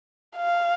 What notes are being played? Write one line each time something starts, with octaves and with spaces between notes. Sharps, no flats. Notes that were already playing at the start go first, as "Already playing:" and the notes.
F5